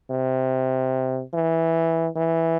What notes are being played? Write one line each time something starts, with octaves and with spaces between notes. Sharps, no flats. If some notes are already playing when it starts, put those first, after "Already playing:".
C3
E3
E3